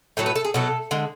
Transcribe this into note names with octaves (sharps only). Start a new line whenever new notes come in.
A2 F#3 A3 A4
B4
A4
G#4
B2 F#3 A3 A4
D3 G#3